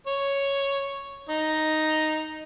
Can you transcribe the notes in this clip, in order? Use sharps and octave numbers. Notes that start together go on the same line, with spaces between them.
C#5
D#4